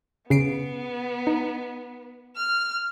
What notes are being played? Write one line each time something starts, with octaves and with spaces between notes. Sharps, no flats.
C#3 B3 C7 D7
D#4
F6